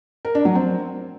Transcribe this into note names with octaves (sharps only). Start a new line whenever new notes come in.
A#4
D4
F#3
C4